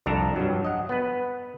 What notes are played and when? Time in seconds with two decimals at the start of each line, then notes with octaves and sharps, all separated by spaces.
0.06 C2 F2 D4 A4 A#5
0.36 G2 F#3
0.65 D#5 F#5
0.89 B3 B4